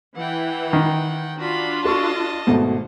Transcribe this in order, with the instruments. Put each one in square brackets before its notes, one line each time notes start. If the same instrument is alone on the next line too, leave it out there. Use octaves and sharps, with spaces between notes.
[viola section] E3 [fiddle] F#5 G5
[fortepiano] D#3
[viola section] D4 F4 [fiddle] F#4 B5
[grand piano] F#4 A4 C#6 [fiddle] D#5 A5
[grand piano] G#1 B2 A3